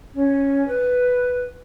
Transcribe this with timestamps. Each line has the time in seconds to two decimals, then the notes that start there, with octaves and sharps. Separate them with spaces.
0.14 C#4
0.67 B4